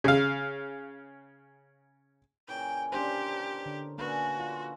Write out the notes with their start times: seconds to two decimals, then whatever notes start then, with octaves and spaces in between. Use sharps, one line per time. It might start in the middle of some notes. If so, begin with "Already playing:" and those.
0.04 C#3 F5
2.48 A#2 C#3 E3 G5
2.92 C#4 D4 G4 A#4 C5
3.66 D3
3.98 A3 A#3 C#4 D4 F#4 B4
4.40 F4